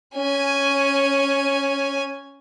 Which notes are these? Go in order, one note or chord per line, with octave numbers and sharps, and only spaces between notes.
C#4 G#5